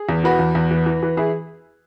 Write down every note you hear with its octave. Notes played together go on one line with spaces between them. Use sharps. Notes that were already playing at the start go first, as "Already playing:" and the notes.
Already playing: G#4
E2
E3 F#4 B4
E2
E2
E3
E3
E3
E3 E4 G#4